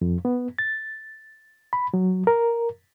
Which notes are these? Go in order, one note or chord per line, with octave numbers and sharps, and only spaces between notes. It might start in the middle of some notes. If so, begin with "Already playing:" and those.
F2
B3
A6
B5
F#3
A#4